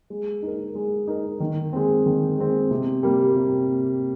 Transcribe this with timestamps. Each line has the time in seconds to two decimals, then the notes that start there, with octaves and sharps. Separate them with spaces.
0.10 G#3
0.42 D#4 A#4
0.75 G#3
1.08 D#4 A#4
1.40 D#3
1.73 G#3 C4
2.06 D#3
2.38 G#3 C4
2.71 C3
3.03 G3 A#3
3.36 C3